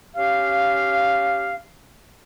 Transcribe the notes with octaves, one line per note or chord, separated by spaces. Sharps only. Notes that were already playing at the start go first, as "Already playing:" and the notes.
C#4 G4 F5